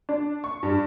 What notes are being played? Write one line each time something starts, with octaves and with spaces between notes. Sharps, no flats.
D4
C#6
G2